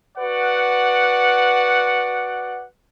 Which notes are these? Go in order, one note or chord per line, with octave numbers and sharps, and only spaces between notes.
F#4 B4 D5 F#5